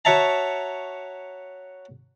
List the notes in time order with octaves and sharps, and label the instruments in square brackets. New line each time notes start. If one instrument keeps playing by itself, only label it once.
[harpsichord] F#4 C#5 E5 A5 A#5